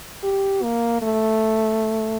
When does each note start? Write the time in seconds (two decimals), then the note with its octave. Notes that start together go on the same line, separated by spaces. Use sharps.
0.23 G4
0.63 A#3
1.02 A3